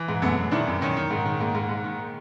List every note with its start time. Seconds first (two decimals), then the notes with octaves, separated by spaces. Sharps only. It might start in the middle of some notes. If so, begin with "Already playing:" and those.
Already playing: E3
0.08 G#2
0.22 F#2 A3 B3
0.37 F#2
0.51 D#3 D4 E4
0.67 F#2
0.81 D#3 C#4 D#4
0.97 D#3
1.11 G#2
1.25 D#3
1.40 G#2 A#3
1.55 G#2
1.69 G#2
1.84 D#3